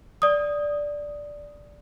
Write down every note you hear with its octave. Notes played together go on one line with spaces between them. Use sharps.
D5 D#6